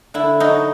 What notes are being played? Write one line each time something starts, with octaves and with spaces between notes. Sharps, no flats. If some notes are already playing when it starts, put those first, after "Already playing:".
D3 E4
F#3 D#4